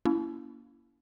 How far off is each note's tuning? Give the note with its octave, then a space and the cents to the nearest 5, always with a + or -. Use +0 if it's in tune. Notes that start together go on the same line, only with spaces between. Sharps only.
A#3 +15 C#4 +40 E4 +15